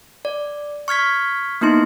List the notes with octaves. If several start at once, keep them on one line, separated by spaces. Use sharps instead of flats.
D5
C#6 F6 G#6 B6
A#3 B3 D#4 E4 C6